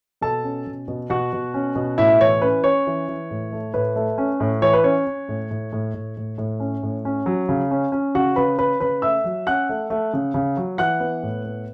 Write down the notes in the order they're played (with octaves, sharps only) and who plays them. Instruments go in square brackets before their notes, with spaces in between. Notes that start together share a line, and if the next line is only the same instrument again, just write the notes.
[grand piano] B2 A4 A5
C#4
B2
B2
B2 F#4 F#5
B2
C#4
B2
A2 E4 E5
E3 C#5
C#4 B4
C#4 C#5
E3
E3
A2
A3
A2 B4
A3
C#4
A2
E3 C#5
B4
C#4 C#5
C#4
A2
A2
A2
A2
A2
A2
C#4
A2
C#4
F#3
C#3
C#4
C#4
C#3 F#4 F#5
C#3 B4 B5
C#4 B4 B5
C#3 B4 B5
A3 E5 E6
F#3
C#4 F#5 F#6
A3
A3
C#3
C#3
F#3
E3 F#5 F#6
B3
A2
B3